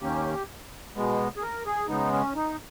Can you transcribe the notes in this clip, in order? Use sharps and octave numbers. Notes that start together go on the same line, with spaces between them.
D#2 D#3 A#3 C#4 G4
B2 G#3 B3
G#4
A#4
G#4
C#3 G#3 B3 D#4
C#4
D#4